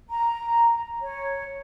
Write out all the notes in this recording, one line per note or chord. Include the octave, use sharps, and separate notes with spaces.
A#5
C#5